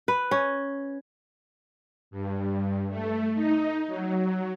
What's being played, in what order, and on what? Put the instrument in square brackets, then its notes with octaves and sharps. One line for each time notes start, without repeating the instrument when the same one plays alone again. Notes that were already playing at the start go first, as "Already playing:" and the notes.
[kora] B4
C#4
[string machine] G2
A3
D#4
F#3